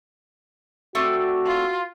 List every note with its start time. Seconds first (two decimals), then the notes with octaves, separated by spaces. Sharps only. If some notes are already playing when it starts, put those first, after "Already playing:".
0.95 A3 C4 D4 F#4
1.46 F4